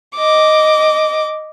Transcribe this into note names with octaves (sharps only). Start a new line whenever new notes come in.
D#5 D6